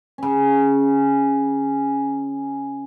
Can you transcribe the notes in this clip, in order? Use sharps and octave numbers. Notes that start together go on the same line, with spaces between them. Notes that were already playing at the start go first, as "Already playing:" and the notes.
C#3 C#4